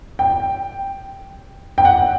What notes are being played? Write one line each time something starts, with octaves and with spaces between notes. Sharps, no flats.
G5
G5
F#5